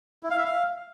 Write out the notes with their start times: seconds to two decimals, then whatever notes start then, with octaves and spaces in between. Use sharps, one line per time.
0.23 E4
0.30 F5
0.38 E5
0.45 F5